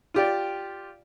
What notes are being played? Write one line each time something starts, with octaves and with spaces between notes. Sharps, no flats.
F4 G4 D5